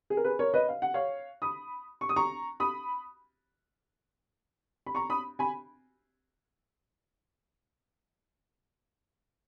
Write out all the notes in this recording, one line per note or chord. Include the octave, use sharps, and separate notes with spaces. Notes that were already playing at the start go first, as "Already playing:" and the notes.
G#4
A#4
G#4 B4
A#4 C#5
B4 D#5
F5
F#5
C#5 F5
B5 D#6
C#6
D#6
A#5 C#6
B5 D#6
B5
A#5 C#6
B5 D#6
G#5 B5